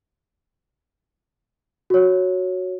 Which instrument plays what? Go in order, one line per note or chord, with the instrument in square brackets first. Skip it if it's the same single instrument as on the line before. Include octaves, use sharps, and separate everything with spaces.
[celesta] F#4 C#5